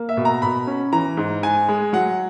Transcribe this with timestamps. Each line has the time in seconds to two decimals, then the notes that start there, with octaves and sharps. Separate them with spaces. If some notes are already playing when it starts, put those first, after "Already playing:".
Already playing: A#3
0.09 E5
0.17 B2
0.25 A#5
0.42 B2 B5
0.67 C#4
0.93 E3 A#5
1.17 G#2
1.43 G#2 G#5
1.68 G#3
1.93 F#3 F#5